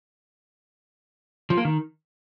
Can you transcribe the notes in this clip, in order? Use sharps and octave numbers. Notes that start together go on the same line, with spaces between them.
F3
A#3
D#3